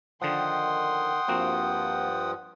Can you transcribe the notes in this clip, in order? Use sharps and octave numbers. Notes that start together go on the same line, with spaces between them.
D3 D#3 F3 F#5 G5 C6 D#6
G2 F3 A#3 C4 F#4